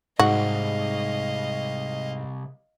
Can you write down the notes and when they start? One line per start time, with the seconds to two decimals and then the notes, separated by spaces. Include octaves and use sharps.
0.19 C2 G#2 F#4 D#5 F5